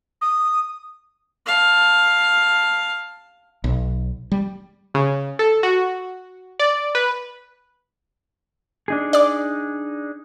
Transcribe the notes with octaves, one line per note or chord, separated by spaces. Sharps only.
D#6
F5 A5
B1
G3
C#3
A4
F#4
D5
B4
D4 D#4 G#4
D5 D6